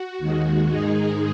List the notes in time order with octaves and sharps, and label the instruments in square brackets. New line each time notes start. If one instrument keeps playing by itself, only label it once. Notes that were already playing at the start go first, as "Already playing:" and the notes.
Already playing: [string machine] F#4
D#2 D#3 G#3
G#2 D#3 G#3 D#4 G#4